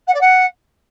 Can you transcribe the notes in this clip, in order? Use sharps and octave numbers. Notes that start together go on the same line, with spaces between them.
F#5
D5
F#5